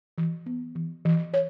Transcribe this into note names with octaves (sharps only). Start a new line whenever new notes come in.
E3
B3
E3
E3
C#5